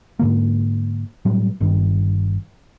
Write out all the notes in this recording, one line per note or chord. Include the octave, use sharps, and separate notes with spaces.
G#2 D3 A#3
A2 F#3 G3
G1 G2 D#3